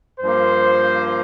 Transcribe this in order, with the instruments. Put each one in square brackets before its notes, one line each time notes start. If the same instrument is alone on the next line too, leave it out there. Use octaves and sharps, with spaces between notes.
[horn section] G2 F3 A#3 C5